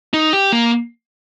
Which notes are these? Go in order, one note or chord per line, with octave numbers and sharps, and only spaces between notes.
D#4
G4
A#3